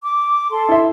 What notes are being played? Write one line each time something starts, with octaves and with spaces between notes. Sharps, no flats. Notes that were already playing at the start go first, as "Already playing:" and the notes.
D6
A4 A5 C6
E4 E5